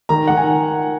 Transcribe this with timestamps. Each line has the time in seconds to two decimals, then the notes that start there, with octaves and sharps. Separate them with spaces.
0.09 D#3 A#5
0.28 D#3 F#5
0.37 G#5